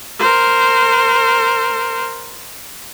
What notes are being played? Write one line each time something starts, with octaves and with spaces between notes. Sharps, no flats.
A#4 C5